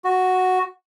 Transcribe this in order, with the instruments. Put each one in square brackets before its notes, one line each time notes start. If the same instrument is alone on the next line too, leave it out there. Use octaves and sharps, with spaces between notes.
[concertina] F#4